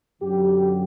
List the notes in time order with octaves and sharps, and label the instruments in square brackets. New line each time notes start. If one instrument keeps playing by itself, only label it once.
[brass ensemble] F#2 D3 F#3 G4